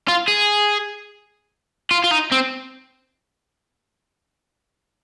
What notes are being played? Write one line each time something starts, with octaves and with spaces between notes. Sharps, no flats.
F4
G#4
F4
F4
D#4
C4